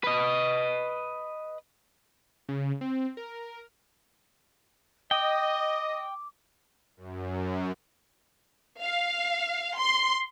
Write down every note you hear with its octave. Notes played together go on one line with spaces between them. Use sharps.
B4 D#5
C#3
C4
A#4
D#5 G5 D6
F#2
F5
C6